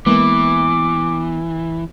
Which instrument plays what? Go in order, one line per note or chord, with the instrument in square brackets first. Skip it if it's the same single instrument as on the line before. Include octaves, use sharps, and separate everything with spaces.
[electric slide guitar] E3 [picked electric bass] G#3 A#3 [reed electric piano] B3 [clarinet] D6